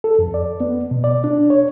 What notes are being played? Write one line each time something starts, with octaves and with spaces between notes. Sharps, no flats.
A4
F2
D5
B3
B2
D5
D4
C#5